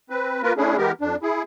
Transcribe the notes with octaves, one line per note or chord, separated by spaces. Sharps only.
C4 B4
A#3 F4 A#4 B4
A3 C#4 D4 E4 G#4
E3 G#3 B3 G4 A#4
F2 D4
E4 G#4